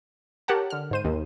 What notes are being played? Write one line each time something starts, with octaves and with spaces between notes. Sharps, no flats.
G4 A#4 C#5 F#5 A5
D3 F6
G#2 C5 D#7
D#2